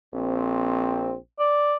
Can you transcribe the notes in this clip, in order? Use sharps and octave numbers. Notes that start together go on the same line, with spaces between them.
A#1 C4
D5